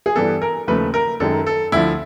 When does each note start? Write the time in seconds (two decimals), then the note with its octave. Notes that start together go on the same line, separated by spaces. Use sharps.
0.06 G#4
0.16 G2 E3 G3 B3 A4
0.42 A#4
0.68 D#2 C#3 F3 A3 B4
0.94 A#4
1.20 F#2 D#3 G#3 A4
1.46 A4
1.72 D2 D3 F3 E4